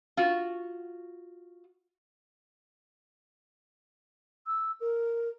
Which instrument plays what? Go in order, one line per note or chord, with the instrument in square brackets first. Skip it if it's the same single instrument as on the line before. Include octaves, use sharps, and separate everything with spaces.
[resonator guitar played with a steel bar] F4 F#4
[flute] E6
A#4